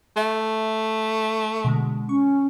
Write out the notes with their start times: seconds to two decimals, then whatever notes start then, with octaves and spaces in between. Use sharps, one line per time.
0.16 A3 E5
1.64 B2 D3 G#3
2.09 C#4 C#6